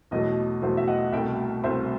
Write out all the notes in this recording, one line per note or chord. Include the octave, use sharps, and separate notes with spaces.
E2 B2 F#3 A3 D#5
E2 B2 F#3 A3 C5 E5
E5
D#5 F#5
C2 B2 A3 E5 G5
C2 B2 A3 C5 E5